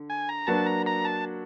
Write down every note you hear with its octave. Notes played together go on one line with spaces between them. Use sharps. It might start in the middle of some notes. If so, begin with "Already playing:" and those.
Already playing: D3
G#5
A#5
F#3 A#3 D4 F#4 B4 A5
A#5
A#5
A5